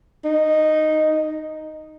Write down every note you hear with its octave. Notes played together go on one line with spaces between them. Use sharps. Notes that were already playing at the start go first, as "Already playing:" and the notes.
D#4